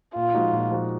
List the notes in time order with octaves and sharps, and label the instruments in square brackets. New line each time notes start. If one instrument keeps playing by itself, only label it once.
[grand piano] A#2 [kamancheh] F4
[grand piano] F3 G#3 D#4 F#4
A#2
F3 G#3 D#4 F#4